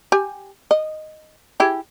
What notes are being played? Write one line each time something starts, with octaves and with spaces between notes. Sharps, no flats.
G4 G#5
D#5
E4 G4 G#4